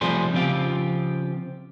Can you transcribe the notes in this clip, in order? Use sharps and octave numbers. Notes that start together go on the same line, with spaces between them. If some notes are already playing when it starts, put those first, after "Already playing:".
C3 F3 G3 A3 G#4 C5
C#3 F3 C4 F4 G4